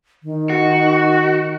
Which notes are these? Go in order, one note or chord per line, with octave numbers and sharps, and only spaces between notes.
D#3
F#4